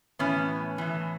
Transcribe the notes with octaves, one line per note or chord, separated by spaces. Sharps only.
A2 E3 B3 C#4
A2 E3